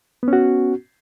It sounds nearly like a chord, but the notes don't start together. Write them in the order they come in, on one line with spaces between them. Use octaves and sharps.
B3 C#4 F#4